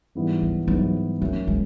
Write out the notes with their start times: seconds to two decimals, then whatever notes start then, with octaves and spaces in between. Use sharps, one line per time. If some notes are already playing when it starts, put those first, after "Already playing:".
0.15 G#2 E3 G3 B3 E4
0.42 F#3
0.68 G#2 E3 F#3 G3 B3 E4
1.21 F#3 A3 A#3 C#4
1.48 G#3